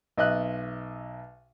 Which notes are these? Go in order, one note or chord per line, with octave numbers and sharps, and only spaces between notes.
B1 D#5 E5 F#6